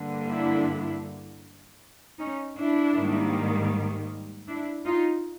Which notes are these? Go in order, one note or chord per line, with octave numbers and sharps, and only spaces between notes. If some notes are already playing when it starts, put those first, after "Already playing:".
Already playing: G2 D3 G3 A#3
D4 E4
C#4 D#4
D4 E4
G#2 D#3 G3 A#3
D4 E4
D#4 F4